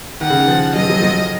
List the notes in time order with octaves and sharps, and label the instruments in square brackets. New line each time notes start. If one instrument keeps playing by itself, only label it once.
[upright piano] D#3 [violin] F#5
[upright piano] C#3
D#3
F3
[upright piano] F#3 [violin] D#5
[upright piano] F3
F#3
F3
F#3